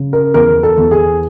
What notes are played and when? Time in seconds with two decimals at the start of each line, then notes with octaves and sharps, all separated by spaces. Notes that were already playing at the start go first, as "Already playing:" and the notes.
Already playing: C#3
0.13 A#4
0.34 E2 A#4
0.63 A4
0.78 E2
0.91 G#4